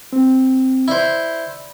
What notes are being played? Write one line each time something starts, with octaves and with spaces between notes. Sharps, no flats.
C4
E4 C5 D5 B5